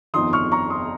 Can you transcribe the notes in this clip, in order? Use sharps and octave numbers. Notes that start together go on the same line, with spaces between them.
G1 F2 D#3 C6 D#6
C#6 F6
A#5 C#6
C6 D#6